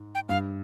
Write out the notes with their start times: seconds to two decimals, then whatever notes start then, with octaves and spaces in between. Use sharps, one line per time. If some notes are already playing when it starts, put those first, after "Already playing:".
Already playing: G#2
0.15 G5
0.29 G2 F5